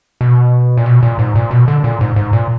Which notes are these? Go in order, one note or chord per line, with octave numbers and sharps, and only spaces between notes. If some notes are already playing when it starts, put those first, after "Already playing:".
B2
A#2
B2
A#2
G#2
A#2
B2
D3
A#2
G#2
G#2
A#2